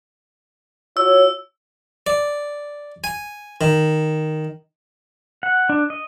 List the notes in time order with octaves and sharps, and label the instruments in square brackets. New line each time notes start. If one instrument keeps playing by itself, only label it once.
[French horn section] F4 F#4 C#5 [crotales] E6
[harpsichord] D5
G#5
D#3
[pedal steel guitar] F#5
D4
D#5